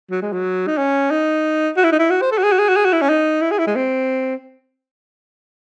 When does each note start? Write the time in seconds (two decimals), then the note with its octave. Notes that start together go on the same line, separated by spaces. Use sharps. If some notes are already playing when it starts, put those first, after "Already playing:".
0.11 F#3
0.22 G#3
0.33 F#3
0.67 D#4
0.78 C#4
1.11 D#4
1.77 F#4
1.84 E4
1.92 D#4
1.99 E4
2.10 F#4
2.22 C5
2.32 A4
2.38 F#4
2.43 G#4
2.52 F#4
2.59 G#4
2.68 F#4
2.76 G#4
2.85 F#4
2.93 E4
3.02 C#4
3.09 D#4
3.42 E4
3.51 G#4
3.58 E4
3.67 G#3
3.76 C4